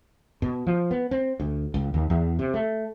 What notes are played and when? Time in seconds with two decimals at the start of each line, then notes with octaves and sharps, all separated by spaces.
0.42 B2
0.67 F3
0.91 B3
1.11 C4
1.40 D2
1.74 C#2
1.94 D#2
2.10 E2
2.39 C3
2.54 A3